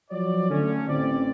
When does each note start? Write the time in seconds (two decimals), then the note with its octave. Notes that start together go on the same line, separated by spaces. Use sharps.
0.11 F3 F#3 F#4 C#5 D5
0.50 D3 A3 C#4
0.88 A1 C4 D5